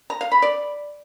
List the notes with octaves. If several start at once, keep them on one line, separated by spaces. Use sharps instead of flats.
A#5
F5
B5
D5